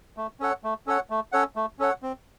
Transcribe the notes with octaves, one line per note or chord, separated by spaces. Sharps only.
A3
C#4 A4 C#5 F#5
A3
C#4 A4 C#5 F#5
A3
C#4 A4 C#5 F#5
A3
C#4 A4 C#5 F#5
C4